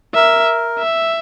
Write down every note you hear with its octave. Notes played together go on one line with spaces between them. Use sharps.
A#4 E5
E5